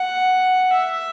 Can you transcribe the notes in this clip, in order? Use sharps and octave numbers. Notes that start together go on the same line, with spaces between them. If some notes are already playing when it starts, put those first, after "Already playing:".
Already playing: F#5
E5